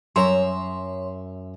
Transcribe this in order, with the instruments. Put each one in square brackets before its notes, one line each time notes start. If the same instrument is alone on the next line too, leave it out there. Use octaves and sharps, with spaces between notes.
[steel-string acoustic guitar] F#2 E5 A#5 [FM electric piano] C#5 C6